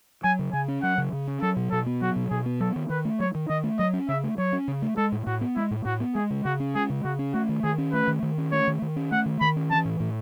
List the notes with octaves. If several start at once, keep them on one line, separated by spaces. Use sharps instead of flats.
F#3 G#5
C#3
C#3 G#5
C#4
F#3 F#5
C#3
C#3
C#4
F#3 A4
B2
B2 A4
B3
F#3 F#4
B2
B2 G#4
B3
F#3 A4
D#3
D#3 B4
A3
F#3 C#5
D#3
D#3 D#5
A3
F#3 D#5
C#4
C#3 E5
A3
F#3 C#5
C#4
C#3
A3
G#3 A4
A2
A2 F#4
B3
G#3 E4
A2
A2 F#4
B3
G#3 G#4
C#3
C#3 F#4
C#4
G#3 G#4
C#3
C#3 F#4
C#4
A3 F#4
D#3
D#3 G#4
C#4
A3 B4
D#3
D#3
C#4
A3 C#5
D#3
D#3
C#4
A3 F#5
D#3
D#3 B5
C#4
E3 A5
A2
A2